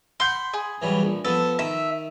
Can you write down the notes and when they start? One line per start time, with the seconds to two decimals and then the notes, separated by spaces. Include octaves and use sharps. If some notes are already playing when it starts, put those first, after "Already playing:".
0.20 F#5 B5 C6 G6
0.54 G#4
0.82 E3 F#3 G3
1.03 A#1
1.25 F3 B3 A4
1.59 D#3 E5